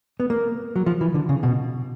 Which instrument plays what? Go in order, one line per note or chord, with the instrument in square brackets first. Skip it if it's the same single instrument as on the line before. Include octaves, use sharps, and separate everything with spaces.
[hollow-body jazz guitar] B3
A#3
F#3
F3
E3
D3
C#3
B2